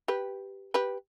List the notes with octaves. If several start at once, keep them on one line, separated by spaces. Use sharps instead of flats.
G4 B4
G4 B4